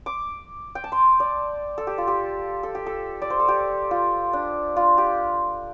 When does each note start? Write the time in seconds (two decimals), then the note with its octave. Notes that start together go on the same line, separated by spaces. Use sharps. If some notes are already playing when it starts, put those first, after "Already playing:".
0.06 D6
0.75 G5
0.84 A5
0.92 C6
1.20 D5
1.78 A4
1.87 G4
1.98 F4
2.07 G4
2.63 A4
2.75 G4
2.86 A4
3.22 D5
3.30 C5
3.40 A4
3.48 G4
3.91 F4
4.33 D4
4.76 F4
4.98 G4